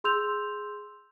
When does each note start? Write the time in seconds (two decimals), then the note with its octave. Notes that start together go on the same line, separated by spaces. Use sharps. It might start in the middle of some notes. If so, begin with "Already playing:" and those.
0.04 G#4 C6 E6 G6 F7